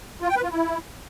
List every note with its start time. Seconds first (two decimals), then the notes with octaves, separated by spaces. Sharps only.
0.22 F4
0.29 G5
0.36 B4
0.44 F4
0.51 E4